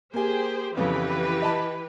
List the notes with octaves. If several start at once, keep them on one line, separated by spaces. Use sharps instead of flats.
A#3 G4 G#4 C5 G#5
F2 C#3 E3 B3 G4 B4
D#5 A5 B5